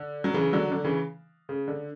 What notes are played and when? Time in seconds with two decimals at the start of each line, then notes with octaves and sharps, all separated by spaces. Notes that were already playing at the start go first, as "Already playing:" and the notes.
Already playing: D3
0.24 F#3
0.34 C#3 E3
0.53 D3 F#3
0.71 D3
0.84 C#3 E3
1.49 C#3
1.68 D3